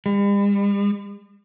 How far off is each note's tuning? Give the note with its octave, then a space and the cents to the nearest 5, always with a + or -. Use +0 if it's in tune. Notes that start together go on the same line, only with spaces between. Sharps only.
G3 +45